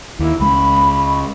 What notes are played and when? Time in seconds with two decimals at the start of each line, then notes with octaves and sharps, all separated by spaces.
0.19 D#2 E4
0.40 C#2 G#3 B5